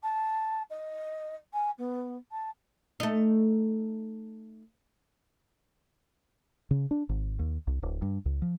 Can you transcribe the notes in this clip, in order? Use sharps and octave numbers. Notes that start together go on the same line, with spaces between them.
A5
D#5
G#5
B3
A5
A3 D#4
C#3
D4
G#1
D#2
C2
D1
G2
C#2
F3